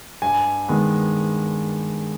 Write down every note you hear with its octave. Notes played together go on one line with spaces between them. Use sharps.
G2 G#5
D#3 G#3 B3